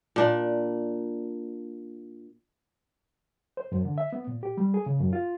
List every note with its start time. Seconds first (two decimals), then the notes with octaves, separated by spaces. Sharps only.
0.16 A#2 D4
3.57 C5
3.72 F#2
3.85 D3
3.98 E5
4.12 B3
4.27 A#2
4.43 G4
4.57 G3
4.74 G#4
4.86 C#3
5.00 F#2
5.13 F4